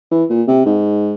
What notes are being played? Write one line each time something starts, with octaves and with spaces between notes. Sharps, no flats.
E3
A#2
C3
G#2